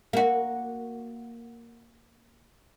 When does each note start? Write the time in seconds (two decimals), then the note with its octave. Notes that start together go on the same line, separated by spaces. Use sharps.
0.13 A#3 F#4